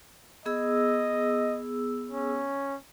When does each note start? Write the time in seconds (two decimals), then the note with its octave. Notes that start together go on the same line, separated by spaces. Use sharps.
0.46 B3 G#4 D#5 E6
2.11 C#4